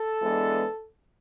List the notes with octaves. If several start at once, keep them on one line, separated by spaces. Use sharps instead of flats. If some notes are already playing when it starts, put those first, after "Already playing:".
Already playing: A4
E3 G#3 B3 D4